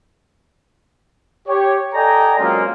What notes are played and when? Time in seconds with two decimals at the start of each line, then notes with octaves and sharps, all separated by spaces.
1.49 G4 C#5
1.95 A4 D5 D#5 G5 G#5 A#5
2.39 F#3 G#3 A#3 C4 C#4 F4